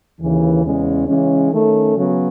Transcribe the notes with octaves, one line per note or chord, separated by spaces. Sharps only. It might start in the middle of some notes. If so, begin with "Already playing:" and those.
D#2 C#3 E3
E2 C#3 G#3 C#4
C#3 E3 G#3 C#4
D#3 A3 C#4
C#3 F#3 B3